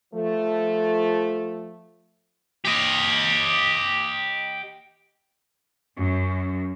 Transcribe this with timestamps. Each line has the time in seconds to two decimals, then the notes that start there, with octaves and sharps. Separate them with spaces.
0.13 F3 A3
2.65 G4 D#5
5.97 F#2